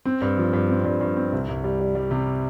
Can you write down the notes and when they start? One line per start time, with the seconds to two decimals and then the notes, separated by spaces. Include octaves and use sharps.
0.05 C4
0.22 G2
0.38 F3
0.53 G2
0.70 C4
0.85 G2
1.01 G2
1.17 C4
1.32 C2
1.49 C2
1.64 G3
1.80 G3
1.95 G3
2.11 C3